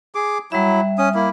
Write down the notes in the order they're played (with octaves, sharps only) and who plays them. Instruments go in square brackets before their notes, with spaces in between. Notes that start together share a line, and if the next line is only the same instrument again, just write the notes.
[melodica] G#4 D6
[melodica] F#3 E4 [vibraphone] G3 E5
[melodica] C#4 D#6
A#3 E4